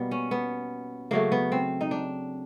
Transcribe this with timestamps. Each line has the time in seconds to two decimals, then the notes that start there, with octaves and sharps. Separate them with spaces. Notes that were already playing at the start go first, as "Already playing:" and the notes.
Already playing: B2 G3 A#3 B3
0.11 C#4
0.31 B3
1.11 C#3 F#3 A3 A#3
1.32 B3
1.52 C4
1.81 D#4
1.91 D4